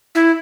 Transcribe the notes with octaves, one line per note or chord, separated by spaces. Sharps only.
E4